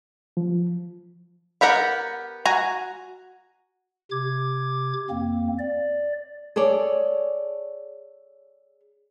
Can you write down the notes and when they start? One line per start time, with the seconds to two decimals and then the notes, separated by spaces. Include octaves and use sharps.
0.37 F3
1.61 B3 G4 A#4 F#5
2.45 F#4 G#5 A#5
4.11 C3 D6 G#6
5.10 F2 A#3 C4
5.59 D5
6.56 G#4 A4 C#5 D5